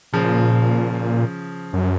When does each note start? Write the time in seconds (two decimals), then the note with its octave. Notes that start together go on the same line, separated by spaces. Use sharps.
0.13 A#2 C#3 F3
1.73 F#2